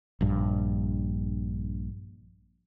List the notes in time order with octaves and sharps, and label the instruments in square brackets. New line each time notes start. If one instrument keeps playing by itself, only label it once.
[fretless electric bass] A#1 G2